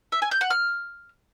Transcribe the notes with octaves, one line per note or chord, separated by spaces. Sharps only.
E5
G#5
G6
F#5
F6